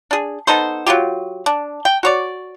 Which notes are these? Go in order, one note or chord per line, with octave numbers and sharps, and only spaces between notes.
D4 G#4
B3 D#4 A4 C5
F#3 B3 F4 G4
D4
G5
F#4 C#5 D5